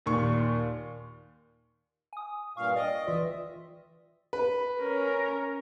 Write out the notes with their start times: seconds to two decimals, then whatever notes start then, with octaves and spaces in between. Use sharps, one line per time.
0.06 D#2 A#2 C#6
2.13 G#5 D#6
2.57 G2 A#2 F5 C#6
2.76 D5 D#5 G5 D#6
3.07 E3 F4 D5 E5
4.33 B4
4.81 C#4 A#4